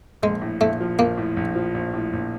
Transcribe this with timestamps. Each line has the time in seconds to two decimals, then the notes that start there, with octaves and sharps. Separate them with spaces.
0.22 A#1 G#3
0.41 A2
0.61 A#1 A3
0.80 F3
0.99 A#1 A#3
1.17 A2
1.37 A#1
1.55 F3
1.74 A#1
1.93 A2
2.13 A#1